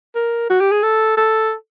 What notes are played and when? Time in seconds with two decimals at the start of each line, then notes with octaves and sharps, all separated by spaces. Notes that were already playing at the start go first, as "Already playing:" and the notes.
0.15 A#4
0.50 F#4
0.60 G4
0.72 G#4
0.83 A4
1.17 A4